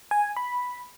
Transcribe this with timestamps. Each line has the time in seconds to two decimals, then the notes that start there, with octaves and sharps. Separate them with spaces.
0.11 G#5
0.37 B5